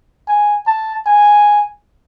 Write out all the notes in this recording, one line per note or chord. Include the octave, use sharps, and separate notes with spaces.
G#5
A5
G#5